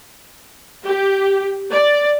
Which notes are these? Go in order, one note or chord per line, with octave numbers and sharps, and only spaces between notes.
G4
D5